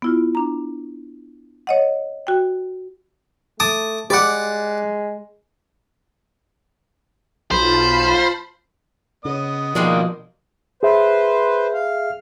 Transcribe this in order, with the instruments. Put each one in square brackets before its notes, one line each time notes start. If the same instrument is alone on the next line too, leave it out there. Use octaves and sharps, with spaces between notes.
[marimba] B3 E4 F4
D4 A#5
C#5 D#5 F#5
F#4 G5
[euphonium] A3 [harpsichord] A5 D6 D#6
[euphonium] G#3 [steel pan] G4 B5 D6 [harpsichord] D5 F#5
[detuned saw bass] B1 [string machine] F4 A5 [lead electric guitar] C5 [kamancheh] B5
[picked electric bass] C#3 [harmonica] B3 D#5 D#6
[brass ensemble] B2 D#3 A#3 [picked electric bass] F3 [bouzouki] G3 G#3 D4
[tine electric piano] G#4 E5 [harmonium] B4 C5
[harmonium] F5